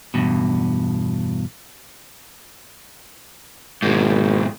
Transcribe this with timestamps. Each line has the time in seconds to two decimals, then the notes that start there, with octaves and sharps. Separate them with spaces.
0.14 E2 G2 B2
3.82 G#1 G#2 B2